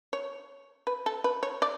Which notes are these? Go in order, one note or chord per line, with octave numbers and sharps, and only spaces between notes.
C#5
B4
A4
B4
C#5
D5